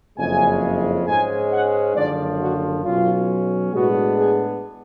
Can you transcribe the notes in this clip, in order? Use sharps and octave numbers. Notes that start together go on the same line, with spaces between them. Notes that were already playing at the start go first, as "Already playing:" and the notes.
F#1 F2 C#3 G#3 G#5
G#2 G#3 C#4 G#5
F#5
F#1 F#2 D3 F3 D5
F#4
B1 B2 F#3 C#4 F4
A2 G#3 B3 D4 F#4
G#4